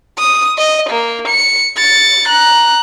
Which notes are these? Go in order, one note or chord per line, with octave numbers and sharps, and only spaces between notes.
D#6
D#5
A#3
C#7
A6 C#7
A#5 F#6